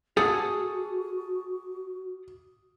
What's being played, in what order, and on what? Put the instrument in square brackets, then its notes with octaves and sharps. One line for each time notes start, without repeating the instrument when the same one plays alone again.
[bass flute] F#4 [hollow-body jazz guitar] G#4 A4 F#5 [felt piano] D#6